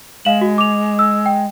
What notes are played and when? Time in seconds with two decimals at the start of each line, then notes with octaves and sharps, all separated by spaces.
0.25 G#3 F5 E7 F#7
0.41 F#4
0.58 D6 F7
0.99 E6
1.26 G5